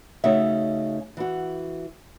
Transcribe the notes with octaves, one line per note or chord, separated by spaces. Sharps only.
C#3 A3 C#4 D#4 F#4 E5
E3 F#4